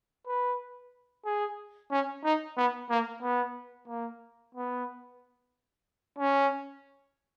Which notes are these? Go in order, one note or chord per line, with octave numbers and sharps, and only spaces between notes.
B4
G#4
C#4
D#4
B3
A#3
B3
A#3
B3
C#4